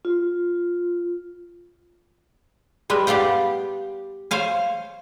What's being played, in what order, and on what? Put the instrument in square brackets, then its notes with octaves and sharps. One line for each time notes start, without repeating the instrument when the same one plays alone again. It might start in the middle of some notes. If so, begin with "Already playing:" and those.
[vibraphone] F4
[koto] G3 G#3 B4
B3 G4 D5 F5 G5
C5 C#5 F5 G#5